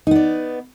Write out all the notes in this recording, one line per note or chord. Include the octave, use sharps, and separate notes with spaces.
B3 D#4 D5